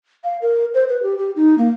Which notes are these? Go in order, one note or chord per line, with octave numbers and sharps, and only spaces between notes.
F5
A#4
C5
B4
G4
G4
D#4
A#3